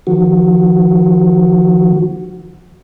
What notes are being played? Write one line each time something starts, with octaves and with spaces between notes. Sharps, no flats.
D#3 F3 F#4